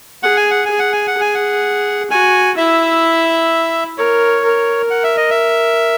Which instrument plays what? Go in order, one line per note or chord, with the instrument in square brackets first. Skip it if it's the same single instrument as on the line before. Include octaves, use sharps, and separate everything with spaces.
[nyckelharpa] G#4 [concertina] F#5
[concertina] G#5
F#5
[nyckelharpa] G#4 [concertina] G#5
[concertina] F#5
G#5
F#5
[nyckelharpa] G#4 [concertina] G#5
[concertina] F#5
[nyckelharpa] F#4 [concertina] G#5
[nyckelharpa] E4 [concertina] E5
[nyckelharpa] A#4 [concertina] C#5
[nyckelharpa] A#4
[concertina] F#5
E5
D#5
E5